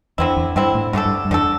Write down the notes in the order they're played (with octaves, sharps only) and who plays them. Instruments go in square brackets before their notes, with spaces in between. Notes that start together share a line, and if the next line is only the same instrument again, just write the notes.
[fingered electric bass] E2 [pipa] D3 C4 E4
[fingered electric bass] E2
[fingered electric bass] G2 [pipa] D3 C4 E4
[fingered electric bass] A2
[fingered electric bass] G2 [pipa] D3 A3 D4 A4
[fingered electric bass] G2
G2
[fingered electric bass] E2 [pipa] D3 A3 D4 A4